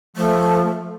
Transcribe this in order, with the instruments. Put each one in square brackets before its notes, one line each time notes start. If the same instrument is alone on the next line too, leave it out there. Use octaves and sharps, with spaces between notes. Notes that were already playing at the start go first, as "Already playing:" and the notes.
[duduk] F3 [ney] A3